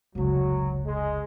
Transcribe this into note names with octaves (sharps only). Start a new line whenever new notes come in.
F1 C#2 F#3
G#3